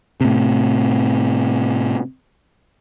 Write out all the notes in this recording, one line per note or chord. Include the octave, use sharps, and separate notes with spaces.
A2 C3